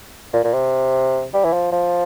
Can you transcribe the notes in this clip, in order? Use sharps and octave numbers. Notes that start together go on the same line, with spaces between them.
A#2
A#2
C3
G3
E3
F3
F3